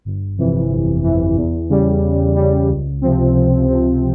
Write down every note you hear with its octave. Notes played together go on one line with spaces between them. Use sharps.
G1
F2 C3 E3
G1
F2 C3 E3
E2
C#3 G3
E2
C#3 G3
C#2
C3 F3 C4
C#2
C3 F3 C4